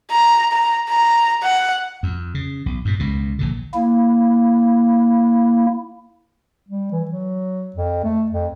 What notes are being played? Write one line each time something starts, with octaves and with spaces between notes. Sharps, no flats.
A#5
A#5
A#5
F#5
F2
C#3
B1
G2 A#2
C#2 B2
A#1 A#2 D3
A#3 E4
G3
E3
F#3
F2
A3
F2